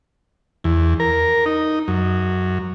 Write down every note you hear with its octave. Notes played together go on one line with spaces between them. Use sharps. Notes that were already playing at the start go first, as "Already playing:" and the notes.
E2
A#4
D#4
F#2